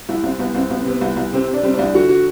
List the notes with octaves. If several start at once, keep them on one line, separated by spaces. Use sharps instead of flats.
C2 E4
C2 C4
C2 B3
C2 C4
C2 B3
C4
C3 B3
C2
C2
C3 C4
C3
D4
G3 C4
C2 D4
D3 F#4
F#4